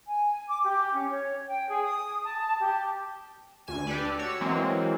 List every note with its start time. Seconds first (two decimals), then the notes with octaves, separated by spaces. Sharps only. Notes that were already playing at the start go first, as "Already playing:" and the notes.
0.08 G#5
0.47 D6
0.64 G4
0.93 C#4
1.09 C#5
1.48 G5
1.69 G#4
1.85 D#6
2.26 A5
2.61 G4
3.67 D2 G#5 E7
3.87 D4 G4 A4 B4 D5
4.19 F#4 C#5 E6
4.41 E3 F#3 G#3 A#3 C4